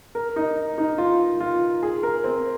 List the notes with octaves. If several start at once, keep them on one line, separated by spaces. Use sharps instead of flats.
A#4
D#4
D#4
F4
F4
G#4
A#4
C4